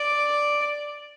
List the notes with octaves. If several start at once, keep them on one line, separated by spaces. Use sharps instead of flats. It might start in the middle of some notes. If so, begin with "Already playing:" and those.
Already playing: D5